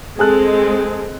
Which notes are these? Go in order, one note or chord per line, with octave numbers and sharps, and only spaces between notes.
G#3 C4 G#4 A4 F#6